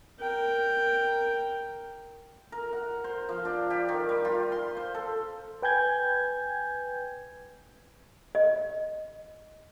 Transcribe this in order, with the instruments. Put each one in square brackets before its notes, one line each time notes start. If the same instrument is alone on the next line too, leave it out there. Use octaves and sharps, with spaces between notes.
[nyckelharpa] A#4 G5
[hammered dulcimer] A#4
F#5
C5
F3
D4
G4
D#3
G3
F4
C6
C5
A4
[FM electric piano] B4 G5 G#5 G6 G#6
[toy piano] D#5